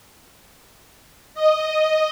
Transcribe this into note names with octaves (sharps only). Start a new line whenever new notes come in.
D#5